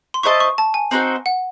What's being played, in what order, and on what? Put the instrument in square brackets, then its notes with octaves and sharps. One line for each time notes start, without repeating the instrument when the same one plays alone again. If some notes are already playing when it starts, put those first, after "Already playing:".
[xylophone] C6
[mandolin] E4 C5 D#5 A5 [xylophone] C#6
[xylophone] C#6
A5
G#5
[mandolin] C4 D#4 F#4 C5
[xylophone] F#5